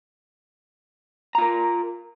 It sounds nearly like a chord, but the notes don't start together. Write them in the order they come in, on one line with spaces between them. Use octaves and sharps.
A#5 F4 A#4